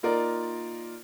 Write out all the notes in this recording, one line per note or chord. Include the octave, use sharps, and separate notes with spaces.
A#3 D#4 F4 A#4 D5